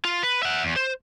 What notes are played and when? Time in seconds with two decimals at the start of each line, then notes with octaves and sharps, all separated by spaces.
0.05 F4
0.23 B4
0.43 E5 F#5
0.63 E2
0.76 C5